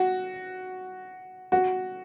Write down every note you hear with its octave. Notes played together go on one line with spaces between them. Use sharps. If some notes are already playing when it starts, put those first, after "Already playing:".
Already playing: F#4
F#4